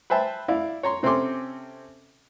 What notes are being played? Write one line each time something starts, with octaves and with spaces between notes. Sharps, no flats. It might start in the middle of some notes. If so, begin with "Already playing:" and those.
B4 C5 E5 G5 A5
E4 D5 F5
C#5 A#5 C6
C3 C4 C#4 A4 C6 D6